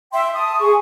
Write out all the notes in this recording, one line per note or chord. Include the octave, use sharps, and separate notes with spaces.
E5 G5 C6
A5 D#6
G#4 C#6